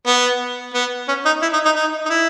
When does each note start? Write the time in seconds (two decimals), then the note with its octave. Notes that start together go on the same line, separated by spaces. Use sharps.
0.07 B3
0.74 B3
1.08 C#4
1.26 D#4
1.42 E4
1.53 D#4
1.65 D#4
1.76 D#4
2.06 D#4
2.10 E4